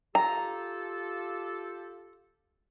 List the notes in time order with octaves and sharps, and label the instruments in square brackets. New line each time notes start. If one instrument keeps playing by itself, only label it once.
[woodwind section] F4 G4 A4 [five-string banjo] A#5